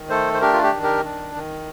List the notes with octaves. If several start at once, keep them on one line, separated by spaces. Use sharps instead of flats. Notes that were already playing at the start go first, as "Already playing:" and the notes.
Already playing: D#3
A3 A4 C5
C5
D4 G4 A#4
F4
G4
D#3
G4 A#4
D4
D#3